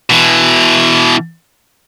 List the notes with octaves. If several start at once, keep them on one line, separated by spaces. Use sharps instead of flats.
B2 E3